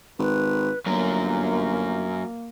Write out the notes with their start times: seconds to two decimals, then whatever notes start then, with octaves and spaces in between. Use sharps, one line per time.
0.19 G#1 B4
0.86 G1 F#2 F#3 A#3